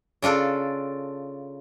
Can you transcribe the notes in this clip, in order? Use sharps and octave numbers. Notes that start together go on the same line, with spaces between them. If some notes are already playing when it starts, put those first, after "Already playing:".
C#3 D4 F4 A4